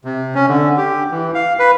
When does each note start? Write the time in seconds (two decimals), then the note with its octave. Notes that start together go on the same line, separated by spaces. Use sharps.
0.05 C3
0.35 C#4
0.48 D3
0.77 G4
1.11 E3
1.35 F5
1.59 B4